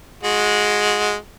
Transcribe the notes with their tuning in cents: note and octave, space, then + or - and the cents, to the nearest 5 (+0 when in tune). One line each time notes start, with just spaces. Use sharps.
G#3 +5 F#4 -30